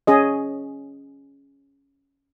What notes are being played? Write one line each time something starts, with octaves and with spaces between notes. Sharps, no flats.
C#4 G#4 D#5